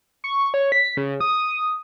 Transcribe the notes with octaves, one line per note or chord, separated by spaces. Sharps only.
C#6
C#5
B6
C#3
D#6